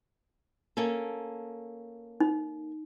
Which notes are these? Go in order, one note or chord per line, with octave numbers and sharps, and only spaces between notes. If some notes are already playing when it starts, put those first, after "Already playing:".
A#3 C#4 A4
D#4